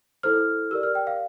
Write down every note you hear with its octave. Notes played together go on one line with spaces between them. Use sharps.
E4 A4 C5 F6
G4 A#4 D5 E6
F6
G5
F5